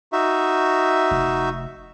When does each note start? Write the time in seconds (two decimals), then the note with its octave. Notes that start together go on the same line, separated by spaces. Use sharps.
0.12 D#4 F#4 E5
1.11 F1